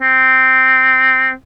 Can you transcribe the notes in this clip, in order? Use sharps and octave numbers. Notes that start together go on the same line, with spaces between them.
C4